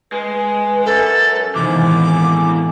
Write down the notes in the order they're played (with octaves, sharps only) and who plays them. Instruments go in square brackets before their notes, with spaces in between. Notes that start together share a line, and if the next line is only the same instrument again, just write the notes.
[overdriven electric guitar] G#3 [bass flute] B4
[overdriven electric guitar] F#2 [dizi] A4
[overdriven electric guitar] E2 G#3 [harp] C3 E3 [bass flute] D#3 [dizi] D6
[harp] A2